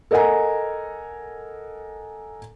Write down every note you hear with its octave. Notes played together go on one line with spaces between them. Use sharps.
A4 A#4 D#5 F#5 G#5 A#5